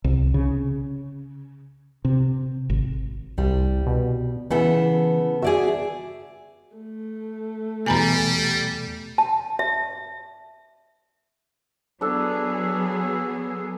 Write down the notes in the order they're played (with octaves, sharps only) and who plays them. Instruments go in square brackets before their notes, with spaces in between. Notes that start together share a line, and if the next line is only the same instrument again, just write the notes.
[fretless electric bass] C2
C#3
C3
G#1
[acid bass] C2 [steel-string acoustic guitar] G3
[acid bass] B2
[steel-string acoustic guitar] C#3 B3 A4 [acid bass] E3
[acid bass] F#4 [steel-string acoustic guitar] G#4 D5 E5
[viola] A3
[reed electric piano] E2 B2 [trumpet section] G3 [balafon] G#5 A#5 B5
[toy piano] A5
E5
[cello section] F#3 B3 G#4 [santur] D4 A4